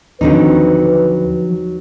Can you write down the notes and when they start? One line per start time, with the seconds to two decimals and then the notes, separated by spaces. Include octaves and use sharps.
0.21 D#2 D3 F3 F#3 C4 D#4 B4